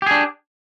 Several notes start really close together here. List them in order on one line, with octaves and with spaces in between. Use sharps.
G4 G#4 D4